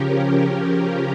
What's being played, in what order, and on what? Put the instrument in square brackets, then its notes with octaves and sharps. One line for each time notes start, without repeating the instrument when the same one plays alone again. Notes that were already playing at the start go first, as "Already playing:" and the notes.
Already playing: [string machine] C#3 F3 C#4 G4 A#4